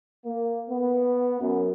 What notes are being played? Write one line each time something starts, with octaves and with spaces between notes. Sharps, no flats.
A#3
B3
F#2